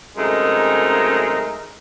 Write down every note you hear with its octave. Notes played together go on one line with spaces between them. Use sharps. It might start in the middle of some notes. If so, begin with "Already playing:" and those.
F#2 C3 G#3 A3 D#4 A#4